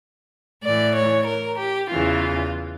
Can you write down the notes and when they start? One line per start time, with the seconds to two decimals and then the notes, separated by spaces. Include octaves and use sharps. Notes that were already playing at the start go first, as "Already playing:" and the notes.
0.63 A2 E3 D5
0.95 C#5
1.27 A#4
1.58 G4
1.90 E2 C#3 E3 F4